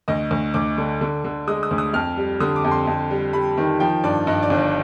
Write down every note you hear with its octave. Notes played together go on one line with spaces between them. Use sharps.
D2 D#5
D2
D2 D6
D3
D3
D3
G#3 D#6
D#6
D2
D#6
F2 F6
G3
D3 D#6
D6
F2
C6
F2
G3
G3 B5
D#3
F3 G5
G2 D5
G2 D#5
D5
G1
D5